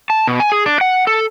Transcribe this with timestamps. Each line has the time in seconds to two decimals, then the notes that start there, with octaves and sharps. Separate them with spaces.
0.10 A5
0.27 B2
0.40 G#5
0.52 G#4
0.66 D4
0.81 F#5
1.07 A4